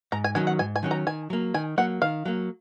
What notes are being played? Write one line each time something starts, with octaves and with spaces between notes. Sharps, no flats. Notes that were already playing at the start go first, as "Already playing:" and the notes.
G#2 A#5
G#5
D#3 F#3 C#4 G#5
F#5
G#2 G#5
G#5
D#3 F#3 C#4
A#5
D#3 G#5
F#3 A#3
D#3 G#5
F#3 A#3 F#5
D#3 F5
F#3 A#3